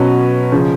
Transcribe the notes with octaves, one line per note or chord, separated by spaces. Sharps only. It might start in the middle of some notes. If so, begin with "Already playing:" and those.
Already playing: B2 F#3 C#4 F#4 B4
C#3 F3